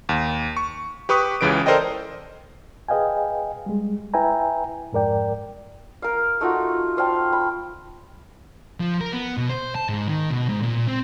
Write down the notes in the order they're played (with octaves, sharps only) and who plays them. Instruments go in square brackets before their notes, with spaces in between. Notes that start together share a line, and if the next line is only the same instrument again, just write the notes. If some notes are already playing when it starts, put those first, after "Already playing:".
[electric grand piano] D#2
C#6
G4 B4 C#6 D#6
C#2 C#3 E3 B4 D7
A4 A#4 C5 D5 D#5 G5
[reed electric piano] G#4 B4 D#5 F5 G5 G#5
G3 G#3
E4 B4 E5 G5 G#5 A#5
F2 G#2 A#4 D5 G5
[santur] A#4 F5
A3 D#4 F4 F#4
C5 F5 G5 A5
B5
[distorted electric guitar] F3
A#4
B3
B2
C5
A5
G#2
D#3
B2
G#2
A#2
C4